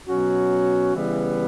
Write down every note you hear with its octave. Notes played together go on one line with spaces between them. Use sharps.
B2 F#3 C#4 F#4
C#3 E3 G3 B3 E4